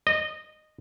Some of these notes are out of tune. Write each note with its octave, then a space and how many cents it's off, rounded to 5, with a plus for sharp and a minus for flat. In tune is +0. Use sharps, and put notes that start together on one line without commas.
D#5 -15